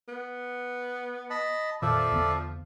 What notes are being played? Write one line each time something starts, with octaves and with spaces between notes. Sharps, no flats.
B3
D#5 A5 B5
F2 A#2 D#3 F3 A4 D5 E5
E2 D3 B3